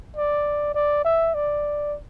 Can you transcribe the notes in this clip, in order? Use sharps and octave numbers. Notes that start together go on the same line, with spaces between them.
D5
D5
E5
D5